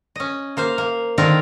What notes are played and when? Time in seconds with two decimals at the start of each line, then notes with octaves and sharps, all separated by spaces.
0.16 C#4 D#5
0.57 A#3 C5 F5
0.78 A#3
1.18 D3 D#3 C4 F4 A#4